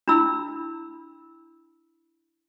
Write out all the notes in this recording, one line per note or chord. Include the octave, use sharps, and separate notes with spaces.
D4 E4 B5 E6